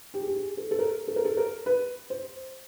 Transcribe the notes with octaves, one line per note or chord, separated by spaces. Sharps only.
G4
G#4
G4
G#4
A4
A4
A#4
A4
A#4
A4
A#4
B4
C5